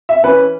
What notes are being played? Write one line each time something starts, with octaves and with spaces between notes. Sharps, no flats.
E5
E3 C#4 B4